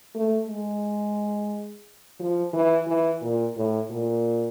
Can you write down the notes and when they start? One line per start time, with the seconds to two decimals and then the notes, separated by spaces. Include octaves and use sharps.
0.15 A3
0.48 G#3
2.20 F3
2.54 E3
2.87 E3
3.22 A#2
3.56 A2
3.91 A#2